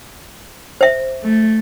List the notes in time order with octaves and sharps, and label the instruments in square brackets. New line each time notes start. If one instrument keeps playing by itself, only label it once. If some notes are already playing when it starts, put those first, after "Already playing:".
[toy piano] C5 E5
[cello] A3